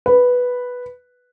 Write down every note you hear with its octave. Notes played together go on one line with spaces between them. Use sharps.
B4